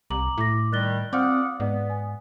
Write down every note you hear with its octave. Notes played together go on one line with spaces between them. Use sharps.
C2 A#5 D6 F#7
A2 E4 D6 A#6
D#3 G3 F#6 A6 G7
C4 F4 D5 F#5 D6 D#6 F6
G#2 B3 D5
G#5